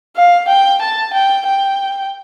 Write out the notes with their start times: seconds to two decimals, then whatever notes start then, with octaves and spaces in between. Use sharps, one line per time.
0.16 F5
0.48 G5
0.82 A5
1.13 G5
1.46 G5